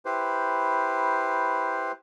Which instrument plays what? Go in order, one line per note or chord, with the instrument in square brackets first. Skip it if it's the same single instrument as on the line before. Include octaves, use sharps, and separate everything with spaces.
[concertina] E4 G4 B4 C5